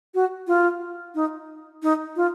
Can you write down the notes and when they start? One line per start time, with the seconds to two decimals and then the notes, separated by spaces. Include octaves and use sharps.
0.15 F#4
0.47 F4
1.15 D#4
1.83 D#4
2.16 F4